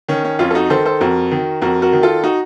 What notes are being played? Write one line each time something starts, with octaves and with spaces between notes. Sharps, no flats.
D#3 C#4
C#4
F2 C#4 F4
A4
D#4 F#4
D#3 A4 C5
A4 C5
F2 F#4 A#4
D#3
F2 F#4 A#4
F#4 A#4
D#3
F4 A4
D#4 F#4